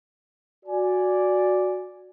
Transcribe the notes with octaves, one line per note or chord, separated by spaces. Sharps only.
F#4 D5 G#5